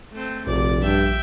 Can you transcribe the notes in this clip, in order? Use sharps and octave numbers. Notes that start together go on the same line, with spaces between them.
A3 C4
F1 A#1 D5
G2 E5 G5